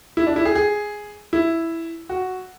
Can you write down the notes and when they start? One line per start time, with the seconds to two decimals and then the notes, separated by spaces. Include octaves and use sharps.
0.17 E4
0.27 D4
0.36 E4
0.45 G#4
0.55 G#4
1.33 E4
2.09 F#4